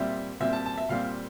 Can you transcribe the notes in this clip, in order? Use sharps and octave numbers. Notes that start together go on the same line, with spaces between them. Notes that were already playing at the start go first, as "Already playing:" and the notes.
Already playing: A#2 G3 C4 E5
A#2 G3 C4 E5
A5
A5
E5
A#2 G3 C4 F5